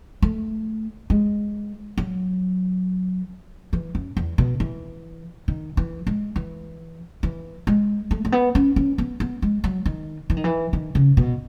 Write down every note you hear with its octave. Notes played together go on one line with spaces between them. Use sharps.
A3
G#3
F#3
E3
F#2
E2
B2
E3
D#3
E3
G#3
E3
E3
G#3
A3
A3
B3
C#4
C#4
B3
B3
G#3
F#3
D#3
E3
D#3
E3
D#3
C#3
B2